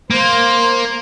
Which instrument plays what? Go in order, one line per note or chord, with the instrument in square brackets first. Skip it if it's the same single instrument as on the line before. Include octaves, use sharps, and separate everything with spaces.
[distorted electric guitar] A#3 [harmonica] C5